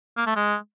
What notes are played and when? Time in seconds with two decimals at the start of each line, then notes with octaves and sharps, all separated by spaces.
0.17 A#3
0.27 A3
0.36 G#3